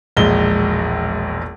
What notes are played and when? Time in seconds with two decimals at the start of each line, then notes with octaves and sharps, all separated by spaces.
0.17 E1 A#1 G#3 G7